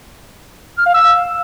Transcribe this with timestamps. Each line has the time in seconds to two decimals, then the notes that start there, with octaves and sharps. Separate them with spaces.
0.78 F6
0.86 F5
0.94 E6